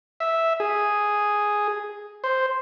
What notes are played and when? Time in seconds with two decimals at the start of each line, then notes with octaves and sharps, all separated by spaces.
0.20 E5
0.60 G#4
2.24 C5